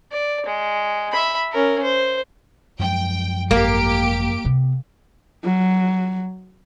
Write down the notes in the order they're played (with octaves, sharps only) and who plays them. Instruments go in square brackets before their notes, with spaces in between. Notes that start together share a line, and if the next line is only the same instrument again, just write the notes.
[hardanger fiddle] D5
G#3
E5 B5
C#4 A#4
C5
[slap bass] F#2 F3 G#3 [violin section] G5
[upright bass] G#1 [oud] A#3 [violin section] G4 D7
[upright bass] C3 B3
[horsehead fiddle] F#3